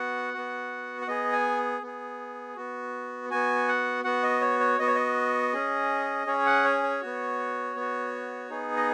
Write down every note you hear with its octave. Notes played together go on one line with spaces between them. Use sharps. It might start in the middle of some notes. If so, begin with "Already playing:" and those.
Already playing: B3 F#4 F#5
B3 F#4
F#5
B3 G#4 D#5
G#5
B3 G#4
B3 F#4
B3 F#4 G#5
F#5
B3 F#4 F#5
D#5
C#5
C#5
B3 F#4 D#5
C#5
D#5
C#4 G#4
C#4 G#4 C#5
F#5
C#5
C#5
B3 F#4
B3 F#4
B3 D#4 G#4
D#5